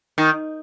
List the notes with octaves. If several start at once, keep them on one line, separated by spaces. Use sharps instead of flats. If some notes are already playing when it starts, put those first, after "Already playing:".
D#3